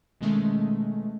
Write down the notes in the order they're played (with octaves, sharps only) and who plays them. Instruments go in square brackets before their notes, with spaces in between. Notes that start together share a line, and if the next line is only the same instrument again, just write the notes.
[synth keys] B2 D#3 G#3 A3 C#4